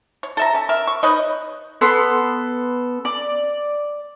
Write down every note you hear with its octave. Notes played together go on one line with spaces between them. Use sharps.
C#5
A4 E5 A#5
C#4
A#4 E5
C#6
D#4 B4 C#5 D#5
B3 A4 C6
D5